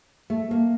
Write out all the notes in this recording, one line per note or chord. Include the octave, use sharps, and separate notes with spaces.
A3
A#3